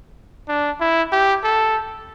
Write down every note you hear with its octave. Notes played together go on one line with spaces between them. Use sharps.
D4
E4
G4
A4